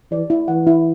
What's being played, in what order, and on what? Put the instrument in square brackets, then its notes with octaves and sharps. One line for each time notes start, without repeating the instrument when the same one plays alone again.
[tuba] E3 [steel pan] D5
[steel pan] E4
[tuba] E3 [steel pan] F#5
[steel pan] E4